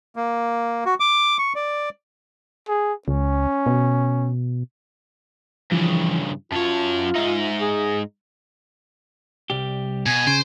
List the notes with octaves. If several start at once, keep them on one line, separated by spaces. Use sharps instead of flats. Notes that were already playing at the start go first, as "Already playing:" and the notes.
A#3
F#4
D6
C#6
D5
G#4
C#2 C#4
B2
G2 C#3 E3 F3
F#2 F4 C#5 A5
G#2 D#4 E5
G#4
C2 G3 G4
B2 G#5
C#3 C5